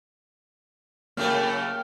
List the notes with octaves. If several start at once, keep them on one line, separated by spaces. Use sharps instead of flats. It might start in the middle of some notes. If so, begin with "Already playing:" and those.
C#3 F#3 A3 A#3 G4 C#5 F6